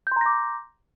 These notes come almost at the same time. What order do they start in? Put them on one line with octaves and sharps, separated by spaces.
G6 C6 A#5 A#6 D6